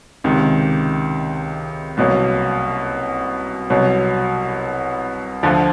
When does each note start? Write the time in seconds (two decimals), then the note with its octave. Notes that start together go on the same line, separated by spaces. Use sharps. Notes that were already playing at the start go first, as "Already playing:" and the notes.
0.24 C#2 C3 D#3
1.97 C2 B2 F#3 A#3
3.70 C2 B2 F#3
5.43 D2 D3 F3